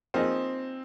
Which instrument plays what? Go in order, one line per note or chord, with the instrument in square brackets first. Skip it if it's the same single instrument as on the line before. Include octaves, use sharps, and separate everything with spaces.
[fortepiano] F3 A#3 D#4 G#4 [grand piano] C4